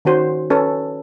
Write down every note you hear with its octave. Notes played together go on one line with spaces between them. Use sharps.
D#3 C#4 F#4 C5
C#4 A4 B4